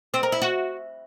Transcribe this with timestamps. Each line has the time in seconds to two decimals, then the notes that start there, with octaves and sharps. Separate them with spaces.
0.14 C4
0.23 A#4
0.32 E4
0.42 F#4